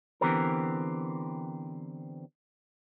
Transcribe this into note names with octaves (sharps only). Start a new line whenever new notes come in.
D3 E3 B3 C4 G4 A#4